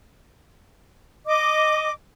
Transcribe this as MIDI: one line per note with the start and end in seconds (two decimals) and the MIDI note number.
1.26 1.90 75
1.26 1.90 86